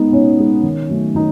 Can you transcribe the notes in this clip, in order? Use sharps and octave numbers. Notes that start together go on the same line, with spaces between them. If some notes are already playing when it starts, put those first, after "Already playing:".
Already playing: G#3 B3 D#4
B2 C#4
G#3
D#3
F#3 A3
D#3 D#4